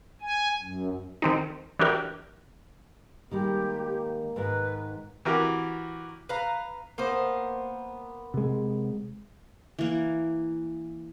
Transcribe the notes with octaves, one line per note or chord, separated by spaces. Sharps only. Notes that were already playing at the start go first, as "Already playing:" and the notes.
G#5
F#2
D#3 C4 D#4
E3 D4 F#4 G4 A#4
D#3 G3 G#3 A#3 G4
G#2 D#3 A#4 B4
E3 F#4 G4 A#4
B4 F5 A#5
A#3 B3 C5
C3 G#3
E3 A#3